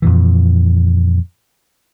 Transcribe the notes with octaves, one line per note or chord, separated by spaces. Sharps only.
F2 A#2 E3